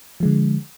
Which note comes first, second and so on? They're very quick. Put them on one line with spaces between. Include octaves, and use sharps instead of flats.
F3 G#3 D3